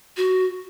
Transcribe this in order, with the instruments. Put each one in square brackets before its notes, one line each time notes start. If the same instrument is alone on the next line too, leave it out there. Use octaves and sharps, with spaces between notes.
[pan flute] F#4